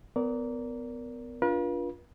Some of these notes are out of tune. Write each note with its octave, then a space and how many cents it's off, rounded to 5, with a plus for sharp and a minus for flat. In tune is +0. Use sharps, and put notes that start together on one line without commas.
B3 +25 A#4 +0 D5 -25
D4 -20 F4 +0 B4 -45